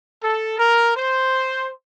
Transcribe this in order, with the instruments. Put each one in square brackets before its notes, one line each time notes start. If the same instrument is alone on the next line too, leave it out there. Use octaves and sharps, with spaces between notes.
[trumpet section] A4
A#4
C5